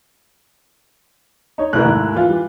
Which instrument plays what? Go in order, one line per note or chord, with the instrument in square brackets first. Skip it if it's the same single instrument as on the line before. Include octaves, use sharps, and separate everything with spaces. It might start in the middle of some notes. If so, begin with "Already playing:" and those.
[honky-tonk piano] D#4 C#5
[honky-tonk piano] C2 F#6 [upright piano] A3 E4 A#4
[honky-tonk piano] D#2 G#2
E3 F4 F5
[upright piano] G3